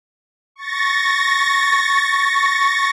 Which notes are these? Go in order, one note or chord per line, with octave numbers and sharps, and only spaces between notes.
C#6 A6 A#6